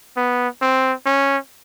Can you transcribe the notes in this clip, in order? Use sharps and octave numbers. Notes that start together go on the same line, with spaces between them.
B3
C4
C#4